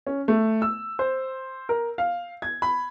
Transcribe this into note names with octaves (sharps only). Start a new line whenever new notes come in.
C#4
A3
E6
C5
A#4
F5
G#6
B5